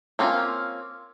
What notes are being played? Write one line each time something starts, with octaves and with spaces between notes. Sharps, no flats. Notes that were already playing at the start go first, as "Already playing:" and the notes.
A#3 C4 C#4 F4